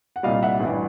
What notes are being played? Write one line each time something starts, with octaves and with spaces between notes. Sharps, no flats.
F#5
C2 A#2 G3 D#5 F5
E5 F#5
A1 G2 E3